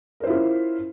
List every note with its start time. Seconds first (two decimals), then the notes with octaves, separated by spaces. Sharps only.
0.20 A#4
0.24 C5
0.27 E4
0.30 F4
0.33 C#4